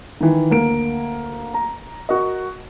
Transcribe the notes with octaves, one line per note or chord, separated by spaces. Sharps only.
D#3 E3
D2 A#3 D7
A#5
F#4 A#4 D#5